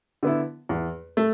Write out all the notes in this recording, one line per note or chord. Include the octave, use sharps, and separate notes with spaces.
D3 B3 E4
E2
A3